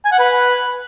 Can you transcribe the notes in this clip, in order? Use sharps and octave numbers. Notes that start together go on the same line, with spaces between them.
G#5
F#5
B4